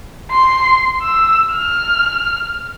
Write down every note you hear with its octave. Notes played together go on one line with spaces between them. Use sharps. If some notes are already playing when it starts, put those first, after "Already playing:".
C6
E6
F6